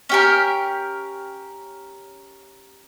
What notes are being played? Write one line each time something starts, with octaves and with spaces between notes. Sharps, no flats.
C#4 G4 A#4